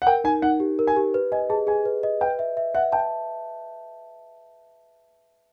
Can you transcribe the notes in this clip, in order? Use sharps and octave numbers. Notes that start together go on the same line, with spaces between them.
F#5
A#4 G5
D#4 G#5
D#4 F#5
G4
A#4
G#5
G4
B4
D#5 G#5
G#4 A5
G#4 G#5
B4
D#5
B4 G5
E5
E5
E5 F#5
G5 A5